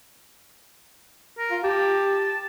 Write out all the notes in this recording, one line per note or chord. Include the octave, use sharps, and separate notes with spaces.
A#4
F4
G4 A5